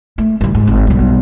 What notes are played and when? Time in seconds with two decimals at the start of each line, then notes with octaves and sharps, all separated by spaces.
0.18 A3
0.41 E3 G3
0.55 G#2
0.67 G#1
0.87 B1 G3